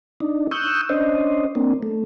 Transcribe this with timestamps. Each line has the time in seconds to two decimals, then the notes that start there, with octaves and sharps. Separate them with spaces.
0.20 D4 D#4
0.51 C#6 D#6 E6 F#6 G6
0.89 C#4 D4 C5 D#5
1.55 A#3 C4 D4
1.83 A3